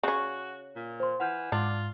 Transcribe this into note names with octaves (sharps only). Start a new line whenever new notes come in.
C#3 C#4 F#4
A#2
C5 C6
E3 F#5 F6 G6
G#2 D4 F4